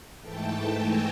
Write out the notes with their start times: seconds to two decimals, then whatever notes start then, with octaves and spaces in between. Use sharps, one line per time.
0.21 G#2 E3 A3 G5 A5
0.74 G#5 A#5